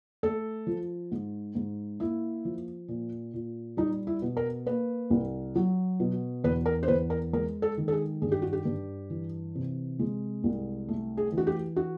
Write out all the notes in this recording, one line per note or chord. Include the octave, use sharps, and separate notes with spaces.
A3 A4
F3
G#2
G#2
A#3 E4
F3
A#2
A#2
G3 D#4
E4
B2
A#4
A#3 B4
C2
F#3
B2
E2 B4
A#4
C5
E2 B4
A#4
G#3 A#4
A4
D#3
A4
G#4
G2 G#4
G4
F#4
G4
G2
E3
C3
G#3
C2
A3
G#4
E3
F#4
G4
F#4